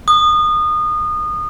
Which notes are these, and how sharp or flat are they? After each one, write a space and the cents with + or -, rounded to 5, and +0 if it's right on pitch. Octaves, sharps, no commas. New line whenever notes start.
D#6 -25